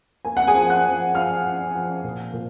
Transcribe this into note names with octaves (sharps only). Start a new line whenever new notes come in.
A#3 G#5
F#5
G#4 G#5
F3
F#5 F#6
F3
F3 F5 F6
F3
F3
A#2
A#2